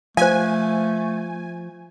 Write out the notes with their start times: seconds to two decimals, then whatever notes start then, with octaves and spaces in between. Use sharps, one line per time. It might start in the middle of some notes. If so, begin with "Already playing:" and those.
0.17 F3 A3 C5 F5 G#5